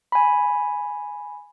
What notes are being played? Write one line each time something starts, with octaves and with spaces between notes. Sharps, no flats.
G#5 B5